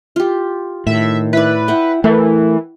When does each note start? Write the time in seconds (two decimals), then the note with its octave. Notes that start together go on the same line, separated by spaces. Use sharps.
0.16 F4 G4
0.87 A2 D#3 E5
1.33 E4 B4 D5
1.68 E4 E5 F#5 G5
2.04 E3 A3 A#4